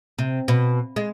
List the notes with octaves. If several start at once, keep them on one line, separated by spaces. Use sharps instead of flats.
C3
B2
G#3